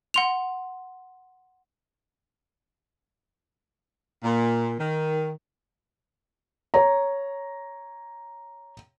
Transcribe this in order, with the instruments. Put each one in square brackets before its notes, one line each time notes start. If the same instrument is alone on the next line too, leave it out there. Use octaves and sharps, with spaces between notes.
[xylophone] F#5 C6 F7
[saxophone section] A#2
D#3
[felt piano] C#5 A#5